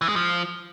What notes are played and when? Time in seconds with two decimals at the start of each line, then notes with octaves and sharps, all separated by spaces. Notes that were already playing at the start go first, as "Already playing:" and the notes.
0.01 E3
0.09 G#3
0.16 F3